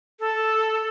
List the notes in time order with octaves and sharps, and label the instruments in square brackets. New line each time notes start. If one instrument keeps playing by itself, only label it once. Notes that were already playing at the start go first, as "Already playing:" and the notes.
[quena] A4